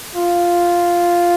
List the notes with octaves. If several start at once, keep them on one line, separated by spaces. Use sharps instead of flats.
F4